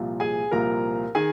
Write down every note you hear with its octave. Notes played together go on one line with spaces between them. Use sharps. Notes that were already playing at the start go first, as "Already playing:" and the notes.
Already playing: C2 A#2 F3
G#4 G#5
C2 A#2 F3 A#4 A#5
D#3 G#4 G#5